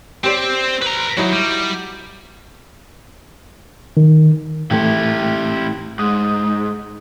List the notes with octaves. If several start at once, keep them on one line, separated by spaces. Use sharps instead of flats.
C4 G4 C5 D5
B4 A#5
F#3 D#4 E4 F#4
G3
D#3
A2 E3 A3 E4 G4
G#2 D#6